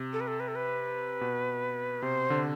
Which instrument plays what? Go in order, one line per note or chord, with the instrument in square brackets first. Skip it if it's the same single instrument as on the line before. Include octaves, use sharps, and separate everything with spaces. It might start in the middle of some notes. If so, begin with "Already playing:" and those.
Already playing: [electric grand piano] C3
[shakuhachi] A4
B4
A4
B4
A4
B4
[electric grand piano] B2
[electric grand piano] C3 [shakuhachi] C5
[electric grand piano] D3